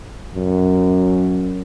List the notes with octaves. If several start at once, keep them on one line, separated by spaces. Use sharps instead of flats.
F#2